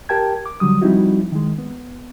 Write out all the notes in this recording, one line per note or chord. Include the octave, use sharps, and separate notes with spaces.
G4 A#4 G5 A5 G#6
D6
D3 F#3 G3 D#6
F3 G3 C4 D#4 E4 F#4
D#3 G#3
B3